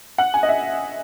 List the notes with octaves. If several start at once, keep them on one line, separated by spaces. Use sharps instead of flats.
F#5
G#5
D#5
E5